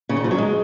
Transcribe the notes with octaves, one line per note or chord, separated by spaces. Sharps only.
C#3
D#3
F3
F#3
G#3